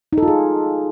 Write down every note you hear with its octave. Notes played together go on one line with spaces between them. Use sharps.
D#4
A4
F4
G#4